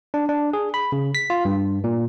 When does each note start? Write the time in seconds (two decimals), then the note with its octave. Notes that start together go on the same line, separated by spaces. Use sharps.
0.14 D4
0.29 D4
0.53 G#4
0.74 B5
0.92 C#3
1.15 B6
1.30 F4
1.45 G2
1.84 A#2